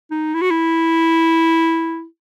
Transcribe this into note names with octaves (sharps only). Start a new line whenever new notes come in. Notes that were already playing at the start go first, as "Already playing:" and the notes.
D#4
E4
F#4
E4